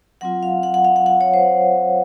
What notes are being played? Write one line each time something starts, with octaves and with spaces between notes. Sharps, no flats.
F#3 C4 F4 F#5
F5
F#5
F#5
F5
F#5
F#5
C#5
C5